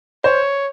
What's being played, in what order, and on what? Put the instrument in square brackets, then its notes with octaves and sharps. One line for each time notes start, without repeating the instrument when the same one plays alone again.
[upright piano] C5 [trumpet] C#5